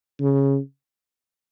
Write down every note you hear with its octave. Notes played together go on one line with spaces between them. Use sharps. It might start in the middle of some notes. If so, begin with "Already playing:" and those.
C#3